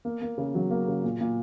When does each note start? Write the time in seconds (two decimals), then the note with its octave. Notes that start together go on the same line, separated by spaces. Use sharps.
0.05 A#3
0.22 A#3
0.38 C#3
0.55 F#3
0.70 A#3
0.88 C#3
1.04 A#2
1.20 A#2